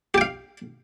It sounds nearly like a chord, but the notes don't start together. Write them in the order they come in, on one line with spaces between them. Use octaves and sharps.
G4 G5 F5